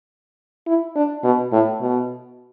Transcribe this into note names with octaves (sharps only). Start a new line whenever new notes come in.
E4
D4
B2
A2
B2